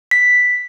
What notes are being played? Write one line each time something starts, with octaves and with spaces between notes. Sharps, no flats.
B6